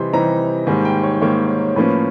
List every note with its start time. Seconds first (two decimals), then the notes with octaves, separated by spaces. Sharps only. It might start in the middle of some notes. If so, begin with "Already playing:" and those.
Already playing: C3 E3 G3 C4 D#4 C6
0.13 C3 E3 G3 C4 D#4 A#5
0.67 G#2 D#3 G3 A#3 G#5
0.85 G5
1.03 C#5
1.22 G#2 D#3 G3 A#3 C#5
1.76 A2 F3 A#3 C#4 B4